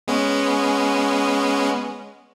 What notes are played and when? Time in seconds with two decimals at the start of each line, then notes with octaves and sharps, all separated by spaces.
0.08 G#3 B3 C#4